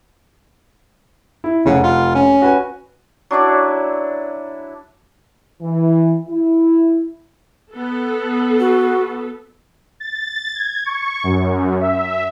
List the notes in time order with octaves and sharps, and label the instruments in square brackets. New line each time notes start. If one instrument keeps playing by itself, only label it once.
[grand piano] E4
[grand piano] F1 F#5 [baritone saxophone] C#3
[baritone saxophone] F4
C#4
[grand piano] F#4 B4 G#5
[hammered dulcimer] F#3 D4 E4 D5
[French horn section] E3
E4
[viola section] B3 A4
[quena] F#4
[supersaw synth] A6
G#6
C#6
F#2
E5